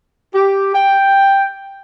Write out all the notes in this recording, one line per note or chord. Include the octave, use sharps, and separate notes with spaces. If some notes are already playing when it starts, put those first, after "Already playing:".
G4
G5